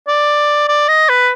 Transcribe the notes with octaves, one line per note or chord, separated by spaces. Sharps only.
D5
D5
D#5
B4